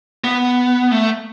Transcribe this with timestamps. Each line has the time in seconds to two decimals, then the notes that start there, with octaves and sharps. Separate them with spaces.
0.24 B3
0.91 A3